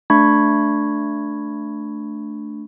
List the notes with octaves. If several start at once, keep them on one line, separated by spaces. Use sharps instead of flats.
A3 D4 B5 C#6 G#6